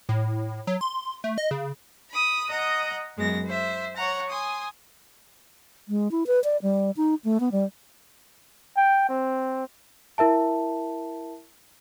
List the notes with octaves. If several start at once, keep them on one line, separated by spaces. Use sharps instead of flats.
A2
F#3
C6
A3
D#5
C#3
B5 D#6
D#5 F#5 A#5 D#6
F#2 G#3 B3 A#6
C5 E5
C#5 F#5 A#5
G#5 C6 D#6
G#3
E4
B4
D5
G3
D#4
A3
B3
G3
G5
C4
E4 A#4 E5 A5